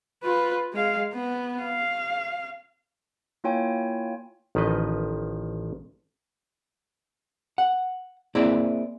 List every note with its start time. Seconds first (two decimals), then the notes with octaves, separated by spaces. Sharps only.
0.24 F4 B4
0.73 G#3 F5
1.13 B3
1.63 F5
3.44 A#3 E4 F4 C#5 G5 G#5
4.55 A1 D#3 F3 B4 D#5
7.58 F#5
8.35 A#3 C4 E4 G#4 D5